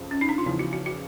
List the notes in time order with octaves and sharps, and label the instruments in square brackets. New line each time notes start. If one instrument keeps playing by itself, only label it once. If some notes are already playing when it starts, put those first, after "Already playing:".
Already playing: [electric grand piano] F2 C#3 F3
[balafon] C#4
D#4
D4
F4
[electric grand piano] E2 C#3 F3 [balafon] E4
[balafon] F#4
F#4
F#4